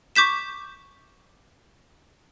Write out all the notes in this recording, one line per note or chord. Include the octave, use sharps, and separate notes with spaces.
C#6 D6 G6 B6 E7